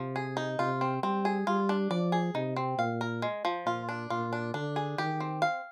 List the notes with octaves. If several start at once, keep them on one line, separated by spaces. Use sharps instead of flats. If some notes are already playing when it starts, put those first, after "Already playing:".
Already playing: C3 F3
G#4
D#4
C3 F4
C4
G3 C4
G#4
G3 F4
D4
F3 D5
G#4
C3 D#4
C4
A#2 F5
A#4
G#3
F3
A#2 F4
D4
A#2 F4
D4
D3 D4
G#4
D#3 G4
C4
F5